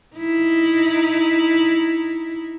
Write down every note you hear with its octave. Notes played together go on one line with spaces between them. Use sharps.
D#4 E4